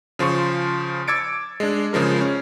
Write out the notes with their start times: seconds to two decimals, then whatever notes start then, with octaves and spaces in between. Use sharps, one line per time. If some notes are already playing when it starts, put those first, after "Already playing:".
0.19 C#3 F3 C6 C#6
1.08 D6 E6 G#6 A6 C#7 D7
1.60 G#3 D4
1.93 C#3 F3 G#3 A#4
2.21 C#4